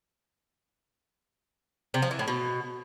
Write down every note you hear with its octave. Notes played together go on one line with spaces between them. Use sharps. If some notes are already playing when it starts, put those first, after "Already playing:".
C3
F3
E3
A2
B2